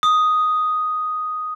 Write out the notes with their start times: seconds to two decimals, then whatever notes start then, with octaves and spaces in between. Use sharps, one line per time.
0.03 D#6